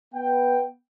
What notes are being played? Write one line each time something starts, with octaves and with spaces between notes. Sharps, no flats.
B3 G5